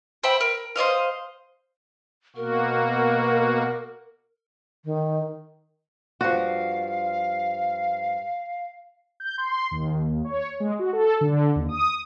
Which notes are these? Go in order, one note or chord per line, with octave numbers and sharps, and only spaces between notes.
C5 E5 G5 B5
A#4
C5 D5 D#5 F5
B2 A#3 F#4 A#4
D#3
G2 F3 F#4 F5
G6
C6
D#2
C#5
G#3
F#4
A4
D3
D#2
D#6